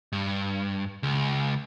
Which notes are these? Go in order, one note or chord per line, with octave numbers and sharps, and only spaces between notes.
G2
C#2